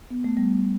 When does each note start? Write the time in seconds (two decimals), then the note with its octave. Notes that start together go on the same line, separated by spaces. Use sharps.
0.10 B3
0.24 A3
0.37 G3 B3